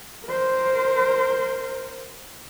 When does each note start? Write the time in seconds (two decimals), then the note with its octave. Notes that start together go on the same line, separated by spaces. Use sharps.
0.25 A#4 C5